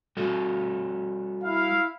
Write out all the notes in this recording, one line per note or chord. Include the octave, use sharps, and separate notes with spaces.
G3 F#4 A4
E4 F5